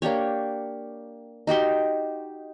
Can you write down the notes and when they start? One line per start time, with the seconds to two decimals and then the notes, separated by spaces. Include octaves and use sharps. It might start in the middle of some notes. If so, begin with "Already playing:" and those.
0.02 A#3 D4 G4 C#5
1.47 D#4 F#4 G4 C6